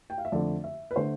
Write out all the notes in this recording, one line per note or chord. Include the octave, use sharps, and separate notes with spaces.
G5
F5
E5
F2 D3 A3 D5
E5
B4
D3 A3 C5